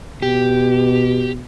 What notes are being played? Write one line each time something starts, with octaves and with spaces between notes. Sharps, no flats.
B2 G4